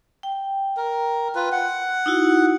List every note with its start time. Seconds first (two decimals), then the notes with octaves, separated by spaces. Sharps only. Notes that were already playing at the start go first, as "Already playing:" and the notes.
0.23 G5
0.77 A#4
1.35 F4 B4
1.52 F#5
2.06 D#4 E4 F#4